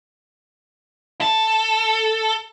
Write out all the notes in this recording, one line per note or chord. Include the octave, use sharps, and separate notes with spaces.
A4